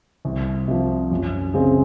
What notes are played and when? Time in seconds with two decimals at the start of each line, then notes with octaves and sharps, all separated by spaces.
0.25 C2
0.68 C3 F3
1.11 F#2
1.54 C#3 G#3 C4